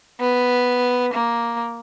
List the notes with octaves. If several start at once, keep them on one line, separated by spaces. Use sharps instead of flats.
B3
A#3